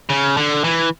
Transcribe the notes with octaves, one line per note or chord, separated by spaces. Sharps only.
C#3
D3
E3